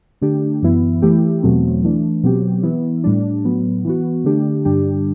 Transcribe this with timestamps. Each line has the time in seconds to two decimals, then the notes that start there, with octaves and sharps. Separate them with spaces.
0.21 D3 A3 D4 G4
0.62 F#2 E3 B3 E4
1.02 E3 A3 E4 G4
1.43 E2 B2 F#3 A3 C4
1.84 E3 A3 D4
2.24 B2 F#3 C4 G4
2.63 E3 B3 E4
3.04 A2 G3 D4
3.44 A2 F#3 B3
3.85 E3 B3 F#4
4.24 D3 A3 D4 G4
4.65 G2 D3 G3 D4 G4